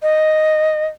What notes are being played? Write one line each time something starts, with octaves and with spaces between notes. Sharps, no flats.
D#5